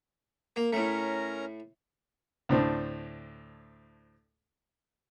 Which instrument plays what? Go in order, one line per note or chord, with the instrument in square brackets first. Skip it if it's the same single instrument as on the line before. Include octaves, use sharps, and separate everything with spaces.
[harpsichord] A#3
[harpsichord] A2 A3 [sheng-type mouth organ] C#4 A#4 A#5
[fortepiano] D2 A2 C4 D4